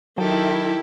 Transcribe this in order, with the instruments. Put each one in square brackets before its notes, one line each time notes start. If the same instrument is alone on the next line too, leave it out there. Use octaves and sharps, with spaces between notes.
[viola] D#3 [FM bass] F#3 [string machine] E4 [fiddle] G4 A4